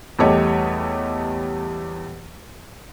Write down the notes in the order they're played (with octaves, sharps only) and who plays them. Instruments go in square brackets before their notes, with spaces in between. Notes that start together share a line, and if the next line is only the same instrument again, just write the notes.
[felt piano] E2 G3 A3 G4 C#5 D#5